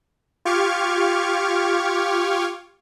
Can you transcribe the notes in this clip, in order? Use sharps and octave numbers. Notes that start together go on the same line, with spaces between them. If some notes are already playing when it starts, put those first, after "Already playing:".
F4 G4 C#6 D6 F6 G#6